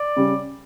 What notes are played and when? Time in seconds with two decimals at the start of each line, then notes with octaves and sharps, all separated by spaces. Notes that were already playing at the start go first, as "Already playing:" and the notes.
Already playing: D5
0.16 C#3 G3